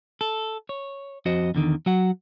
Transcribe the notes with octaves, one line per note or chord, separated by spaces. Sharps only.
A4
C#5
F2 F#4 C5 D#5
E2 D3 D#3
F#3 F#4 F#5